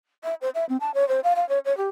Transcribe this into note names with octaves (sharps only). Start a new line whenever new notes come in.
E5
C5
E5
C4
A5
C#5
C5
F5
F5
C#5
C#5
G4